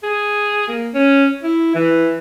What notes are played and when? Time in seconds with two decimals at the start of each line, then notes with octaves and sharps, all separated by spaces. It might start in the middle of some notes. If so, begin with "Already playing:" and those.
0.04 G#4
0.69 A#3
0.94 C#4
1.44 E4
1.75 E3